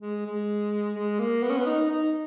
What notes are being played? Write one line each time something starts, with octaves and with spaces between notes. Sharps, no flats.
G#3
G#3
G#3
A#3
B3
C#4
B3
D#4
D#4